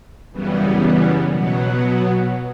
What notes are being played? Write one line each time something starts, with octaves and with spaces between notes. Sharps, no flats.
F#2 C#3 E3 G3 B3
B2 F#3 B3